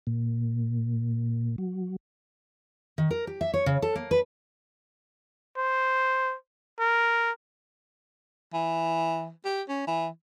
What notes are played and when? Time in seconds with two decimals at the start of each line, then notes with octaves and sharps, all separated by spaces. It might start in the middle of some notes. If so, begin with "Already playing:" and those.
0.07 A#2
1.58 F#3
2.98 D#3
3.11 A#4
3.27 G4
3.41 E5
3.54 C#5
3.66 C#3
3.82 A4
3.95 A#3
4.11 B4
5.57 C5
6.79 A#4
8.54 E3
9.45 G4
9.69 C#4
9.87 E3